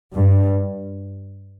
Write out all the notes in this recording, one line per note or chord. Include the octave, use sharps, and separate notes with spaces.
G2